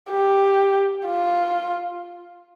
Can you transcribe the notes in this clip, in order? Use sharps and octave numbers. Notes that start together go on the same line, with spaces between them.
G4
F4